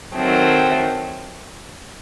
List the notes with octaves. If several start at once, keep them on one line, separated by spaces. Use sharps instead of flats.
D#3 F#3 A3 C4